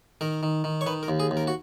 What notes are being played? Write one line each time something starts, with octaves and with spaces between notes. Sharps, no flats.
D#3 A#4
D#3
D#3
C#5
D#3 B4
A#4
D#2
G#4
D#2
A#4
F#4